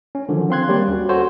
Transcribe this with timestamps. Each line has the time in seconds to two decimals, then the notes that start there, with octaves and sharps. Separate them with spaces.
0.15 C#4
0.29 D3 D#3 F3 F#3
0.50 C4 F5 C6 F#6 G#6
0.69 G3 A#3 G4 C#5 D5
0.88 D#2 C#4 F#4
1.09 F#4 A4 C5 C#5